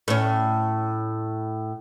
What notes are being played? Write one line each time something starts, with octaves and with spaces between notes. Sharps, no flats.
A2 C#4